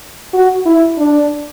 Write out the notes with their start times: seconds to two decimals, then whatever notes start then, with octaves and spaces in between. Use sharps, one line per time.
0.34 F#4
0.66 E4
0.98 D4